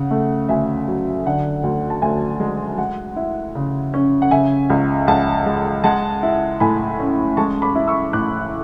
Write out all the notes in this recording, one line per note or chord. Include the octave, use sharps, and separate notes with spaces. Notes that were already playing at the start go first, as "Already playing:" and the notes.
Already playing: C#3 F#5
A3
D2 E5 G#5
F#3
D3 F#5
D2
A5
D2 E5 G#5
G#3
G#3 F#5
E4
C#3
C#4
F#5
C#3 E5 G#5
C#2
C#2 F#5 A5
G#3
G#3 F#5 A5
E4
A2 G#5 B5
C#4
G#3 A5 C#6
B5 D6
E4
C#6 E6
A2 D6 F#6